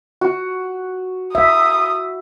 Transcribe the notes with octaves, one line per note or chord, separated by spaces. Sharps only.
F#4
E5 D#6